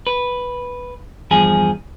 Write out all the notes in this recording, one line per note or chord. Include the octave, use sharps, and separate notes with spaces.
B4
E2 G2 F3 G#4 G#5